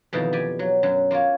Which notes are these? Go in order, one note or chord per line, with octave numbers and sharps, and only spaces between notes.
F2 B2 D#3 E3 A5 A#5
G4 D5 G#5
F#3
F#2 F#3
A#3 F4 A#4 C#5